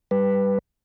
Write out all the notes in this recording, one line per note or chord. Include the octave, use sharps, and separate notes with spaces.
G3 B4